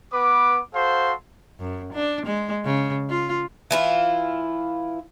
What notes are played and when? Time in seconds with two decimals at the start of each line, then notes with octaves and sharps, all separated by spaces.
0.12 B3 B4 D6
0.74 F#4 A4 C5 F5 C6
1.60 F#2
1.93 D4
2.26 G#3
2.65 C#3
3.10 F4
3.71 E3 E4 F4